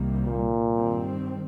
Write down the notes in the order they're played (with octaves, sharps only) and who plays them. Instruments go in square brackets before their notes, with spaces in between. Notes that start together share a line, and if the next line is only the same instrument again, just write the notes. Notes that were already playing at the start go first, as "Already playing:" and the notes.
Already playing: [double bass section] C2 C3 D#3 G3 A#3
[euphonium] A#2
[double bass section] G2 D#3 G3 C4